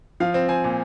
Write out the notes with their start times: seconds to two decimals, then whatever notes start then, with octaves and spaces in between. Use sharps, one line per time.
0.20 F3 F5
0.34 C4
0.49 C4 G#5
0.64 A#2